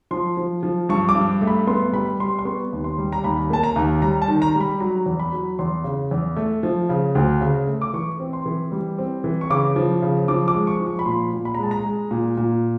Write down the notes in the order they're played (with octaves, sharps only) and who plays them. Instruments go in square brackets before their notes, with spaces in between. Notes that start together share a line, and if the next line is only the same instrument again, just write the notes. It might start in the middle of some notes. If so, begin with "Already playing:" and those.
[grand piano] F3 C6
F3
F3
G2 C#6
D6
G2
A3
B5
B3 C6
G3 B5
G3 C6
C6
B3 C#6
D#2
C6
G3
A#5
D#2 B5
A#3 A5
A#5
D#2
G3 A#5
A5
D#3
A#5
G3
B5
F#3 A#5
E2
B5
F#3
E2 C6
C#3
E2
A3
F3
C#3
D2
C#3
A3
D6
E3 C#6
C4
C6
E3
G3
C4
E3
C#6
C#3 D6
F3
C#3
F3 D6
D6
G#3
C#6
F3
C#6
B5
A#2 C6
A#2
B5
A#5
G#3 A5
A#5
G#3
A#2
A#2